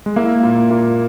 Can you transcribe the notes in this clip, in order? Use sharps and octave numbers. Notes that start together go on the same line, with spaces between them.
G#3
A#3 E4
A#2
A#2